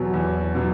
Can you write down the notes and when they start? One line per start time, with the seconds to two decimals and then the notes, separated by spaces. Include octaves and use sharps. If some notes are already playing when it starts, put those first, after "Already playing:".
Already playing: E2 B2 F#3
0.14 E2
0.55 B2 F#3